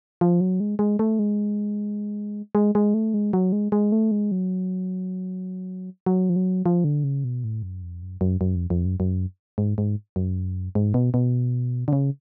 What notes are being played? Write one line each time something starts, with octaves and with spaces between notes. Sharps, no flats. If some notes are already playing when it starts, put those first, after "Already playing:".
F3
F#3
G#3
G#3
A3
G#3
G#3
G#3
A3
G#3
F#3
G#3
G#3
A3
G#3
F#3
F#3
F3
F#3
F3
D3
C#3
B2
A2
F#2
F2
F#2
F#2
F#2
F2
F2
F#2
F#2
G#2
G#2
F#2
G#2
B2
B2
D3
C#3